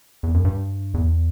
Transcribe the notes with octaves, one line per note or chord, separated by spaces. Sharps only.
E2
F#2
G2
E2